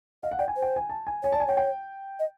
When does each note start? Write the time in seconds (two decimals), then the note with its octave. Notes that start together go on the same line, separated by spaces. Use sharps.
0.23 D#5 F5
0.31 F#5
0.39 D5 G5
0.48 G#5
0.56 C5
0.62 G5
0.76 G#5
0.89 A5
1.07 G#5
1.23 C#5 G#5
1.32 A5
1.36 D5 G#5
1.47 C#5 G5
1.57 G5
2.19 D#5